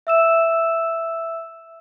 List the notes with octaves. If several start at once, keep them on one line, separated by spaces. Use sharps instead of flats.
E5 E6 E7